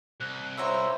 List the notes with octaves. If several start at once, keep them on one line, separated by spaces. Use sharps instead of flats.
C2 F#6
C#2 E4 C5 C#5 A#5 E6